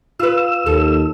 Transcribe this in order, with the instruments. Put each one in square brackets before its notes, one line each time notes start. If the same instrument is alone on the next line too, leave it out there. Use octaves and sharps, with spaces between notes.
[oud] F4 B4 [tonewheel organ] E6
[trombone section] D#2 [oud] A4